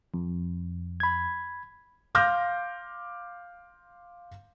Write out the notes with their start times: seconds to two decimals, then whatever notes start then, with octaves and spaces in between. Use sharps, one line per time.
0.14 F2
1.00 B5 G#6
2.15 F5 C6 D6 F6 G6 A#6